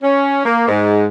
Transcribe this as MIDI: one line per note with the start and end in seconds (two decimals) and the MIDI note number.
0.02 0.44 61
0.45 0.65 58
0.68 1.06 44